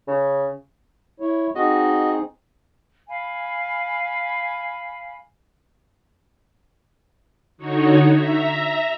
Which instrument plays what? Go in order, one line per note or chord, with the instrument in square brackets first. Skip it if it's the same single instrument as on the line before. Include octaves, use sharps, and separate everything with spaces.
[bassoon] C#3
[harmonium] E4 C#5
[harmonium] C4 D#4 G#4 [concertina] F#4 D#5
[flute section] F5 G#5 B5
[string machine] D3 D#4 F#4 C#5
E5 A#5